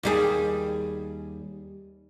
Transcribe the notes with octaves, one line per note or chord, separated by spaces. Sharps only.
D#2 G3 G#4